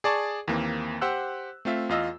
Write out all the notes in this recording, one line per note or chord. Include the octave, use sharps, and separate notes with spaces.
G#4 D5 A5 C#6
D#2 E3 A#3 C4
G4 C5 F#5 E6 F#6
A3 C4 F4 E5
E2 F4 D#5 E6